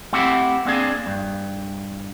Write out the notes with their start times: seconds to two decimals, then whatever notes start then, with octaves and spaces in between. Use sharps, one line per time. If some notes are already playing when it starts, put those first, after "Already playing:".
0.13 A3 C4 E4 G4 F#5
0.65 A#3 C4 D4 G#4
1.06 G2